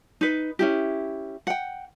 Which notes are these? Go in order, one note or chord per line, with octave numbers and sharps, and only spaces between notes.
D#4 B4
C#4 E4 G4
F#5 G5